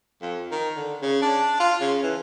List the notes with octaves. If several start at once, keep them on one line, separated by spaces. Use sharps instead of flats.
F2
D#3
D3
C#3
D4
F4
C#3
E3